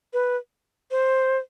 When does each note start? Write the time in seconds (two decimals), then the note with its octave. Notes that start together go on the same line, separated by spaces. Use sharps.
0.13 B4
0.91 C5